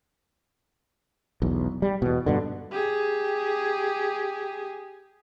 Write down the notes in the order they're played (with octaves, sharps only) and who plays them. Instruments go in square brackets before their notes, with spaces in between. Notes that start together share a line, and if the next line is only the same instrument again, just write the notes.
[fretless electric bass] B1 E2
G3
E2 B2
G2 B2 D3
[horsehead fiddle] G4 G#4